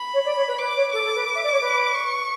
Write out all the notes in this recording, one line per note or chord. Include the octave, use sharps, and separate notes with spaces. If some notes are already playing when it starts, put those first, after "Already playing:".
Already playing: B5
C#5
D5
C#5
B4
B4 D6
C#5
A4 D6
A4
B4
E5
D5
C#5
B4
C#6